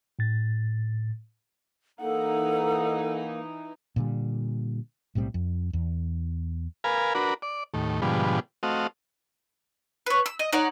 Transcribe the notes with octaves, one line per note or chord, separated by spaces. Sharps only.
A2 A6
E3 A#3 D#4 A4 F#5
A#2 D3 G3
B1 A2 G3 C4
F2
E2
A#4 B4 F5 G#5
D4 F#4 A#4 B4
D5
D#2 A2
G#2 B2 D3 F3 G3
A3 C4 F#4 D#5 F5
B4 C#5
E6
D#5
D#4 C#5 D5 F#5